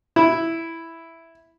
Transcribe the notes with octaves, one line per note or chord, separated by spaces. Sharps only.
E4